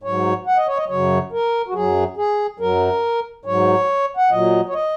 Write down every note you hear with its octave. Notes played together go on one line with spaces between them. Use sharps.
G#2 F#3 C#5
F#5
D#5
C#5
D#5
F#2 C#3 F#3 C#5
A#4
F#4
F#2 F#3 G#4
G#4
F#2 F#3 A#4
G#2 F#3 C#5
F#5
A#2 F#3 D#5
C#5
D#5